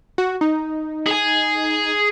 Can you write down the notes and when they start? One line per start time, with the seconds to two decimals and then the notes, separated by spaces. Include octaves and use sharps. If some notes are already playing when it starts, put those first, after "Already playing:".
0.18 F#4
0.41 D#4
1.07 G#4 G#5